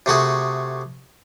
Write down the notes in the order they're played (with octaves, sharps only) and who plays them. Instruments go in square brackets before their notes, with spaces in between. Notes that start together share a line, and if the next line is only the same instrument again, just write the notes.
[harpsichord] C3 A3 F#4 G#4